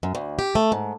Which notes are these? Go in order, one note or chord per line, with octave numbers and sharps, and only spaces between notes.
F#2
D2
G4
A3
G#2